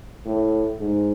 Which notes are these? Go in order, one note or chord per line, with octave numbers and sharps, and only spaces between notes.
A2
G#2